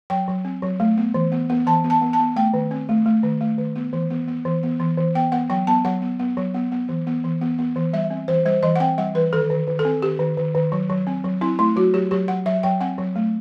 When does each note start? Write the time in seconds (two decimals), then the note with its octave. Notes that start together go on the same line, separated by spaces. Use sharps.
0.10 F#3 G5
0.28 F#3
0.45 C4
0.62 F#3
0.80 A3
0.97 B3
1.14 E3
1.32 B3
1.50 B3
1.67 E3 A5
1.84 B3
1.90 A5
2.01 B3
2.13 A5
2.19 B3
2.36 A3 G5
2.54 D#3
2.71 C4
2.89 A3
3.06 A3
3.23 D#3
3.41 A3
3.58 D#3
3.76 B3
3.93 E3
4.10 B3
4.28 B3
4.45 E3
4.63 B3
4.80 E3
4.98 E3
5.15 B3 G5
5.32 B3 F#5
5.50 F#3 G5
5.67 B3 A5
5.85 F#3 F#5
6.02 B3
6.19 B3
6.37 F#3
6.54 B3
6.72 B3
6.89 E3
7.07 B3
7.24 E3
7.42 B3
7.59 B3
7.76 E3
7.93 G3 E5
8.10 C4
8.28 E3 C5
8.46 G3 C5
8.63 E3 D#5
8.76 F#5
8.80 C4 G5
8.98 G3 F#5
9.15 E3 B4
9.33 D#3 A4
9.50 D#3
9.68 D#3
9.79 A4
9.85 C4
10.02 D#3 G4
10.19 D#3
10.37 D#3
10.55 D#3
10.72 F#3
10.90 F#3
11.07 C4
11.24 F#3
11.41 C4 E4
11.59 A3 E4
11.76 F#3 F#4
11.94 F#3 G4
12.11 F#3 G4
12.28 F#3 F#5
12.46 F#3 E5
12.63 F#3 G5
12.81 C4 F#5
12.98 F#3
13.16 A3